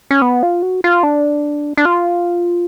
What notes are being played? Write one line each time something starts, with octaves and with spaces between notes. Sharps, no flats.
C#4
B3
F4
F#4
F4
D4
D4
F4